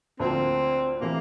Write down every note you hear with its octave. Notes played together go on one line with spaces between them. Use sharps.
D2 D3 F3 A#3 C4
C3 E3 A3 A#3